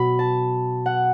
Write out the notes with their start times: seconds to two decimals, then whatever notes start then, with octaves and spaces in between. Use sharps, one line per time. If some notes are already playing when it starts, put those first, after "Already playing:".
Already playing: B2 F#3 B5
0.19 A5
0.86 F#5